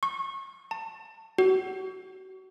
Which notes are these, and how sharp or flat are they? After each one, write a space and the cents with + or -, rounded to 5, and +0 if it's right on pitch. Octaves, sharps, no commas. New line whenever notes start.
C#6 -30
A5 +30
F#4 +35